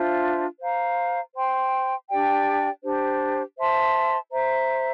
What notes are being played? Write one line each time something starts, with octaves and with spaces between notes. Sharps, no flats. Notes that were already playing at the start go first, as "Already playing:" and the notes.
Already playing: D4 F4 C5 E5
C5 F5 A#5
C5 G5 C6
D4 G4 D5 G5
D4 G4 C5
C5 E5 A5 C6
C5 E5 A#5